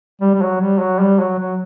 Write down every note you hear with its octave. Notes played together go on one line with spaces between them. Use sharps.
G3
G3
F#3
G3
F#3
G3
F#3
F#3